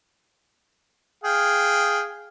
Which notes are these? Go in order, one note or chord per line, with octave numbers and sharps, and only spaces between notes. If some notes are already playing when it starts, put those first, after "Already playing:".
G#4 F5 G5